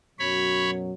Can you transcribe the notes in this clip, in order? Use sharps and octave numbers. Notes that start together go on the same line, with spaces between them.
F#2 B2 F#3 C#5 B5